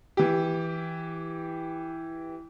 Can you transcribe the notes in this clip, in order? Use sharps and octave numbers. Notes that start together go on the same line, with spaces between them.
E3 G4